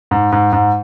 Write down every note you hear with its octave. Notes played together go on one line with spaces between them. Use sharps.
G#2
G#2
G#2